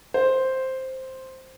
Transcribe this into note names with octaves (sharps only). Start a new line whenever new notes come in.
C5